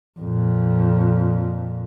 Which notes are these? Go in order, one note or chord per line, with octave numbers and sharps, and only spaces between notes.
F2 A#2